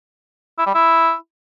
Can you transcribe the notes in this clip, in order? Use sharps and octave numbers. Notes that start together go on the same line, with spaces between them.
E4
G3
E4